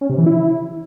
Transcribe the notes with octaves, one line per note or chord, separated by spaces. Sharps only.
C#4
C3
E3
E4